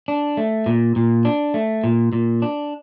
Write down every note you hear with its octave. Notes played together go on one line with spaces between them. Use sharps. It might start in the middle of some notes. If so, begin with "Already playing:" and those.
D4
A3
A#2
A#2
D4
A3
A#2
A#2
D4